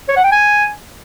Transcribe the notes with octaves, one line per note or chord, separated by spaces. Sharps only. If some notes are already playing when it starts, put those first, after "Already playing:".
C#5
F#5
G5
G#5